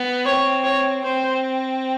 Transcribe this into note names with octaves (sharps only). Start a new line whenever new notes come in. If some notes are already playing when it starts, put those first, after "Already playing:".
Already playing: B3
C4 C#5
C#5
C4 C5